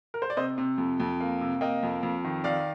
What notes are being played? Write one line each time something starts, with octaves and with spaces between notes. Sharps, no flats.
A#4
C5
D5
C3 C5 D#5
C3
F2
F2
A#3
C3
A#3 D#5 G5
F2
F2
D#3
D#3 D5 F5